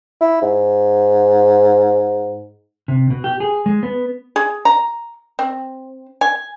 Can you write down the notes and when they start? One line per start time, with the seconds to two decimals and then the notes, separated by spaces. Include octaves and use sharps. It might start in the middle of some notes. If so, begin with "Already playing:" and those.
0.21 E4
0.42 G#2
2.88 C3
3.10 B2
3.24 G4
3.40 G#4
3.66 G#3
3.83 B3
4.36 G#4
4.65 A#5
5.39 C4
6.21 G#5